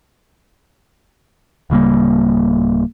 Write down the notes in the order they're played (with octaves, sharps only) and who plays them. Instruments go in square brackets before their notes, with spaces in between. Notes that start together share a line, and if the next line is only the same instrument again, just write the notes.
[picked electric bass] D1 C#3 G3 A#3